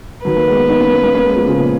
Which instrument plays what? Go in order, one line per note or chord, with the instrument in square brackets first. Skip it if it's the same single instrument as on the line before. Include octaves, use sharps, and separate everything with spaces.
[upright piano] D#3 F#3 [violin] B4
[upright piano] F#3 A#3
G#3 B3
B3 D#4
A#3 C#4
A#3 C#4
A#3 C#4
A#3 C#4
G#3 B3
F3 G#3
C#3 F3
A#2 C#3